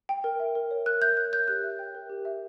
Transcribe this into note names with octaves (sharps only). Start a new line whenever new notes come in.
G5
A#4
E5
A#4
C#5
A#4 F#6
E5 G6
A#4 F#6
C#5 G6
G4 F#6
E5
G5
A#4
G4
E5